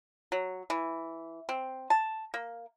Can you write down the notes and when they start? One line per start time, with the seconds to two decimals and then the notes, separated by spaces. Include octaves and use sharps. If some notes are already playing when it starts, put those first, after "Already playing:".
0.32 F#3
0.70 E3
1.49 C4
1.90 A5
2.34 A#3